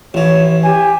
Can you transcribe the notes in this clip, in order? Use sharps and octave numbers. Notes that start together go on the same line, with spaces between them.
A1 E3 C#5
G4 G#5